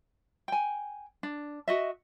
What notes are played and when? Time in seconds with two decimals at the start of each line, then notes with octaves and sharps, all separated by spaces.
0.48 G5 G#5
1.23 D4
1.68 F#4 D#5 E5